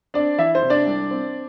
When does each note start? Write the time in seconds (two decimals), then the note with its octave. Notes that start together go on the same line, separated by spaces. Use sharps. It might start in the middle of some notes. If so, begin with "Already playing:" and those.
0.14 C4 D4 D5
0.38 E3 E4 E5
0.55 C5
0.62 C3
0.70 D4 D5
0.86 C2
1.11 C4